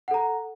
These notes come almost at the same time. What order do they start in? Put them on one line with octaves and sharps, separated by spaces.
F#5 A4 A#5